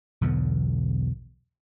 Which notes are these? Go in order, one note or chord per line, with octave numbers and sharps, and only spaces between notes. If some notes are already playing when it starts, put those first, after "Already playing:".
B1 E2 D3 B3